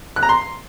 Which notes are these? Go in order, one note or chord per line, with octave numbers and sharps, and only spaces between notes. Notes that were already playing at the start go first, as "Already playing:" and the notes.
F#6
A#5
C6